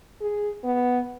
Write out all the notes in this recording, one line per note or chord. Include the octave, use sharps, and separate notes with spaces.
G#4
B3